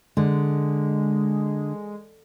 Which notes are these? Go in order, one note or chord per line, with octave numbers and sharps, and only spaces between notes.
D3 G#3